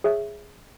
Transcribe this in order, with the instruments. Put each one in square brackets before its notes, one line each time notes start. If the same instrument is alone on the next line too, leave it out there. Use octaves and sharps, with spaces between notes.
[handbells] G#4 C#5 E5